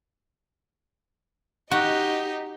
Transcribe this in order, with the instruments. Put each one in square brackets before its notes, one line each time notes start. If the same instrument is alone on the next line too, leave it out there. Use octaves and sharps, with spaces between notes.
[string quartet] D#4 G4 D#5 [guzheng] F#4